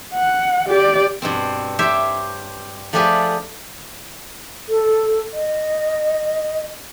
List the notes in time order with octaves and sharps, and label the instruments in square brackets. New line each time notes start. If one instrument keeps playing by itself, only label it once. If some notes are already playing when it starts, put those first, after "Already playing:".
[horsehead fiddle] F#5
G4 D5
[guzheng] G2 B2 C4
G4 C5 C#5 E5 G5
F3 A3 D4 G4 G#4 B4
[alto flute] A4
D#5